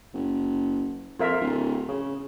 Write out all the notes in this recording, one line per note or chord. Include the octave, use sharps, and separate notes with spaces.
F#1
F2 F4 A#4 E5
D1
C#3